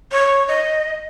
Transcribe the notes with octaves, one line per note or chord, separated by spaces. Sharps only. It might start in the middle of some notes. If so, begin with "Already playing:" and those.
C#5
D#5